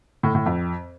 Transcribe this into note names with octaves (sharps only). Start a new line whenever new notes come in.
A2
A2
F2